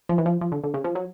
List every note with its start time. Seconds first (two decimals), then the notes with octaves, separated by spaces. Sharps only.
0.09 F3
0.18 E3
0.26 F3
0.41 F3
0.52 D3
0.64 D3
0.74 C#3
0.84 F3
0.95 F#3